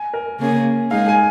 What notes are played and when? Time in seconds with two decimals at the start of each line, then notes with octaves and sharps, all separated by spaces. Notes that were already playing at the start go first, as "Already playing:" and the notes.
Already playing: G#5
0.13 A#4
0.39 C#3 A#3 C#4 G#4
0.91 G#3 D#4 G#4 F5
1.08 G#5